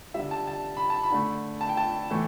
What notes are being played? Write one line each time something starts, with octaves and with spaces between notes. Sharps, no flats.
D3 G3 E5
A5
A5
B5
A5
B5
D3 A3
A5
G5
A5
A2 E3 A3